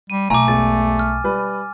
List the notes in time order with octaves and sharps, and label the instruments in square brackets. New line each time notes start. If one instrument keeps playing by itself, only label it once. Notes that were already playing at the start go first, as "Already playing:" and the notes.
[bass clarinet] G3 [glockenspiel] D#7
[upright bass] B1 [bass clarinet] A3 [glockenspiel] G#5 D6 [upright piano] A#5
[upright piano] E1 [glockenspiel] A6
[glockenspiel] F6
[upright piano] G3 B4